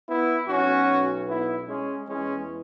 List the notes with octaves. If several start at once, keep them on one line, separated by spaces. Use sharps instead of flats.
B3 E4
B1 B2 C#4 F#4
B3 E4
G#3 C#4
E2 E3 G#3 C#4